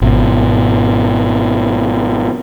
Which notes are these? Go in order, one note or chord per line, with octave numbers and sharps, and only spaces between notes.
G#1 B2